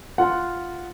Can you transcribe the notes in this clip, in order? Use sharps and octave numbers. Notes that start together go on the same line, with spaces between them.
F4 F#5